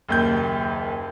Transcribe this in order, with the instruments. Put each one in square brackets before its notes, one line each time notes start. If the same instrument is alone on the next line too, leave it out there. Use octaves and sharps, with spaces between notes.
[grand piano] F#1 D#2 G6